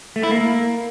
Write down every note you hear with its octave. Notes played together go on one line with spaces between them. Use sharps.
A3
E4
A#3